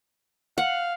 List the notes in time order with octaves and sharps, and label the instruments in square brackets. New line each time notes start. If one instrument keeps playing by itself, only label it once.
[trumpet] F5 [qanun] F#5